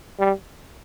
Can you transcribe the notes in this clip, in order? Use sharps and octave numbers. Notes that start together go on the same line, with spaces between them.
G3